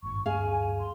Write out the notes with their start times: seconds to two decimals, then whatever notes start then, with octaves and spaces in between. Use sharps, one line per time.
0.03 G#1 G2 A#2 C#6
0.26 D1 G2 C#4 G#4 F5 G#5
0.79 C6